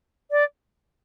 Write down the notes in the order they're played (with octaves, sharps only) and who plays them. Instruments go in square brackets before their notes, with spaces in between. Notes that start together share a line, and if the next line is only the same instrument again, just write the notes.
[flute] D5